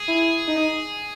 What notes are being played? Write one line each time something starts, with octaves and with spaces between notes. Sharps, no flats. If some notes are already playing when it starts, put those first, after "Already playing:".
Already playing: G#4
E4
D#4